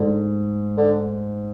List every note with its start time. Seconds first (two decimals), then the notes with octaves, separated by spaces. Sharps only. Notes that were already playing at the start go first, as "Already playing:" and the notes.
Already playing: G#2 D3
0.77 D3